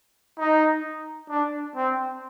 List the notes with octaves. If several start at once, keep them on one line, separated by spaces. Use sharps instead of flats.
D#4
D4
C4